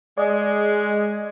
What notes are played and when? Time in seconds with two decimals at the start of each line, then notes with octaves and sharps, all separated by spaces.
0.18 G#3 D5 D#5